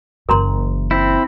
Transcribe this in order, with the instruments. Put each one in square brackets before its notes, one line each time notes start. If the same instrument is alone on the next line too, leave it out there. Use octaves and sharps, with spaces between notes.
[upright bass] F#1 E3 [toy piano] A#4 A#5 C6
[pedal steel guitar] C4 E4